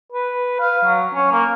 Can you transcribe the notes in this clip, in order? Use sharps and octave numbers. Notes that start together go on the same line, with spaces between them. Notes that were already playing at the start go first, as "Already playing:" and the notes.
B4
F5
F#3
C#4
A#3